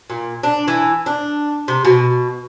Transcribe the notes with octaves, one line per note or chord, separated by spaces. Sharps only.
A#2
D4
E3
D4
C3
B2